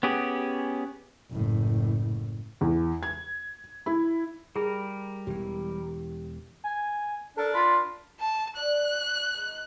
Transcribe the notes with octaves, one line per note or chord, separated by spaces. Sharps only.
B3 C#4 G4 G#4
F#1 A2
E2
G#6
E4
G3 G#4 A#4
E1 E3 G4
G#5
D4 A4 A#4 D5
F4 B5
A5
D5 E5 F#6
G#3 D#4